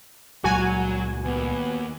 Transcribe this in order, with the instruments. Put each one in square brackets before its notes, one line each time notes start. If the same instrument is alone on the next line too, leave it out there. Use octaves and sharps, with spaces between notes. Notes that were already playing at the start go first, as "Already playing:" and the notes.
[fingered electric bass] C#2 A#2 G3 [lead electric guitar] F#3 [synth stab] F#4 G#5
[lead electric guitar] D#2 [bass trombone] B3